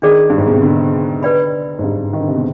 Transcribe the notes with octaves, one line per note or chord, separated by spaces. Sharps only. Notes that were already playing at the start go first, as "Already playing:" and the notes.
D#3 D4 G#4 D5
G2
G#2
B2
C3
D3
B4 D5 G5 B5
G#2
G2
D#3
D3
C3
B2